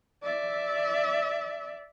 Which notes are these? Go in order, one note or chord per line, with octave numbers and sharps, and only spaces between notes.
D5 E5